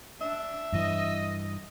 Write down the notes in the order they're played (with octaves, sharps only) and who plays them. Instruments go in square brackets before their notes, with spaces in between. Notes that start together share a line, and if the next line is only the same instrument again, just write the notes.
[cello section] D4 [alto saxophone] E5
[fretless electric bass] G2 E3 [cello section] D#5